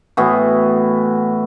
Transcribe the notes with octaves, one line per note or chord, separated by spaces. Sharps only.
A2 E3 B3 F#4